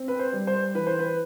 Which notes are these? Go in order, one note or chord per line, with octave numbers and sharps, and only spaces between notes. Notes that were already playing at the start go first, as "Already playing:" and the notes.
Already playing: C4
B4
C5
G3
C5
E3 B4
C5
B4